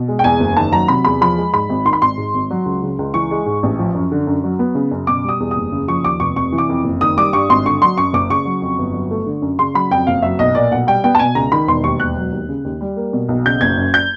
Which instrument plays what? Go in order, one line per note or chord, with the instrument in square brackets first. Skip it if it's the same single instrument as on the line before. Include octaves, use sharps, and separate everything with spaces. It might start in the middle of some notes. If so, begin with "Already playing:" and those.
Already playing: [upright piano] B2
G#3
G5
E2 G#5
F#1
D#3 A5
F#3 A#5
C3 B5
E2 B5
F3 B5
G#3
G#2 B5
G#1
D#3 C6
B5
G#1 C6
G#2
G#1
F#3
C#2
C#3
C#2
E3 C#6
G#3
G#2
A1
F3
F#2
D3
F#2
F#3
B3
C#3
F#2
B2 D6
G3 D#6
E2
D#6
F#1
C#3
F3 C#6
D#2 D6
F1 C#6
C3 C#6
E3
D6
F2
F#1
D#3 D#6
G3 D6
G2 C#6
G#1 C6
D3 C#6
F#3 C6
F#2 C#6
F#1 D6
C#3 C#6
F#3
F2
G1
F#3
A3
D3
F#2
C#3 C6
F#3 B5
F2 G5
F#1 F5
F#3 E5
B1 D#5
A#2 D5
B1 F#5
G3 G5
B3 G5
A5
B2 G#5
C#2 A#5
D#3 B5
E1 C6
D#2 C#6
E1 F#6
F#3
D#2
C#3
D#2
G3
A#3
B2
B1
C#3 G6
F#1 G#6
F#2
G6